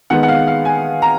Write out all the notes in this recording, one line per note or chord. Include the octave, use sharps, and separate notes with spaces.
D#3 G#3 B3 F#5
F#5
F5
F5
G#5
A#5